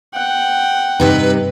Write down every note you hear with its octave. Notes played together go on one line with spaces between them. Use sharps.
F#5 G5
G2 C3 D#4 B4